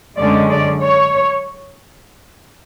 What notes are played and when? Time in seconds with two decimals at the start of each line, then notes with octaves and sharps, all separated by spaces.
0.17 F#2 D3 G#3 C#4 D5
0.50 D5
0.82 C#5